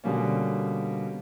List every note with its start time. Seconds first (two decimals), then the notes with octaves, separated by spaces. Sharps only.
0.04 B2 D3 G3 A#3 C#4